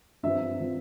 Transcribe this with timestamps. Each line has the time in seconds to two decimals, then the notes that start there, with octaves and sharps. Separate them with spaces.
0.23 G2 F3 C4 E5
0.60 F3 C4